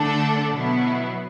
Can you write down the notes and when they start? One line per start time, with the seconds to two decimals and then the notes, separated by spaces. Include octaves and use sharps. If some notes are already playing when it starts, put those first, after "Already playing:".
Already playing: D3 A3 D4 A4
0.53 B2 F#3 B3 E4